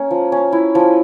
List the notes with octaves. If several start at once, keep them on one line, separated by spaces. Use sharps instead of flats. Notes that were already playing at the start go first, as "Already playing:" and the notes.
Already playing: A#3 C#4
F3
C#4
E4
F3